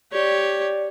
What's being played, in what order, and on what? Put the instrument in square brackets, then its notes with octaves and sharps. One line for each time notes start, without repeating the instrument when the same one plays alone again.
[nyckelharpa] G4 C#5 [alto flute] D5